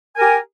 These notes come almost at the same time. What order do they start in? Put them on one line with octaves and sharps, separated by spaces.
G#5 A#4 G4